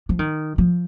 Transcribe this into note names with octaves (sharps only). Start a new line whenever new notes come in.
F3
D#3
F3